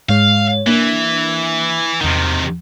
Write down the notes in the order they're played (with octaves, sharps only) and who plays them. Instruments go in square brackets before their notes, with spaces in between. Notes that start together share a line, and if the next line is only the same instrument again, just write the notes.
[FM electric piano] G#2 G#3 C#5 [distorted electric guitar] F5
[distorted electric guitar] E3 [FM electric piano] A#3 D4
[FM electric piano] E2 F#5 [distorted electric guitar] C3 D#3